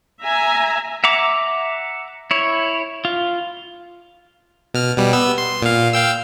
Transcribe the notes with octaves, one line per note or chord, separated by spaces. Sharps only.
E5 G#5 A#5
E5 F#5 A#5 D6
E4 C#5
F4
B2 F6
B2 G3
B3 E6
C6
A#2 F5
F5 G5 E6